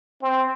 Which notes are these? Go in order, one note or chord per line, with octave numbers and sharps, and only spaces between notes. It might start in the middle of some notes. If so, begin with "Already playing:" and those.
C4